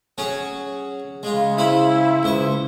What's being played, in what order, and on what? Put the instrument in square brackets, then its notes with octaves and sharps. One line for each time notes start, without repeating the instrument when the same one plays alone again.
[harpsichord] F#3 C#4 G#4
[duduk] C#3 [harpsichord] G#3 F4
[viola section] E4 [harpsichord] F4 C5 B5
[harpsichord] C#2 C5 C#6